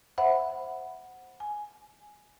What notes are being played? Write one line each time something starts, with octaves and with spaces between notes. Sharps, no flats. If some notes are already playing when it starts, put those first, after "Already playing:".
C5 E5 F#5 B5
G#5